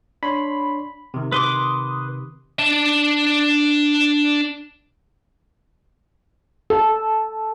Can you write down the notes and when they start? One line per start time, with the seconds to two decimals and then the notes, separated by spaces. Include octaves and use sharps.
0.23 D4 C#5 B5 C6
1.14 C3 D#3
1.32 B4 C6 D6 D#6
2.59 D4 A5
6.70 A4